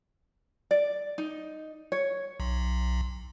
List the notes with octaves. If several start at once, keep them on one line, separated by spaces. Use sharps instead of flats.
D5
D#4
C#5
B1